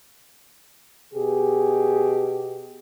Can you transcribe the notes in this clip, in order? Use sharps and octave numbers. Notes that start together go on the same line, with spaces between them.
B2 G4 G#4